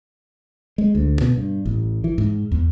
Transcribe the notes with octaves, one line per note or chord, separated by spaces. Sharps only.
G#3
D2
B2
G2
A1
E3
G#2
E2